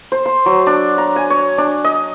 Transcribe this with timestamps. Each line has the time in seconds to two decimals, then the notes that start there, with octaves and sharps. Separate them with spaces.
0.12 C5
0.26 C6
0.46 F#3
0.67 D4
0.98 A#5
1.16 G#5
1.30 C#5
1.58 D4
1.84 D#5